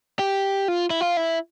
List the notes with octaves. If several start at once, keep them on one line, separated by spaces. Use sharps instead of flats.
G4
F4
E4
F4
E4